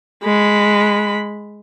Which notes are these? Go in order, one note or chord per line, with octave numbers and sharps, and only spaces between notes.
G#3 B5